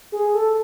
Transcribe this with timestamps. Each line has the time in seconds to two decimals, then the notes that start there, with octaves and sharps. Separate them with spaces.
0.12 G#4
0.34 A4